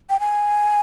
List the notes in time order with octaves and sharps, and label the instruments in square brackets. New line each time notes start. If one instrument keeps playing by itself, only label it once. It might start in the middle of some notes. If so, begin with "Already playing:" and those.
[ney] G5
G#5